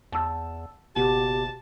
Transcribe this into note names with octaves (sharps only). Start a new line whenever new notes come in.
E2 A5 E6
F#1 B2 F#4 G4 A5